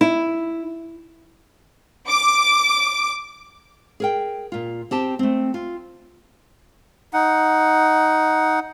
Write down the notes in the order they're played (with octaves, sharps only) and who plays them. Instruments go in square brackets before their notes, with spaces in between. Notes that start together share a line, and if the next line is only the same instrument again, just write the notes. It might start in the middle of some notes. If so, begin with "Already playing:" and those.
[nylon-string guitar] E4
[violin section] D6
[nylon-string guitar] G#4 A#4 G5
A#2 F4
C4 G4 A5
A3 C4
F4
[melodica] D#4 F#5